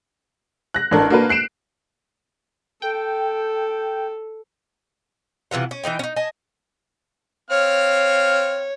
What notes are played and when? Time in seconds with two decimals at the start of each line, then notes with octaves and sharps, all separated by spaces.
0.74 F#6 A#6
0.91 A1 D4 A#4
1.10 A#3 D4 F#4 A#4 B4
1.29 F#6 C7 D7 E7
2.82 A4 G5
5.51 C3 E3 F4 F#5
5.71 C#4
5.84 E3 G3 D#4 G5
5.99 C#4 D#4
6.16 D#5 G#5 A5
7.51 C4 C#5 F5 F6